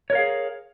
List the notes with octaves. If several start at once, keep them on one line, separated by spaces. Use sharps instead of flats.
G#4 A#4 C#5 F5